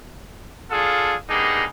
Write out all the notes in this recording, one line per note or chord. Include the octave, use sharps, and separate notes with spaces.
D4 F4 G#4 A4 F5
G3 A#3 B3 D4 D#4 G#4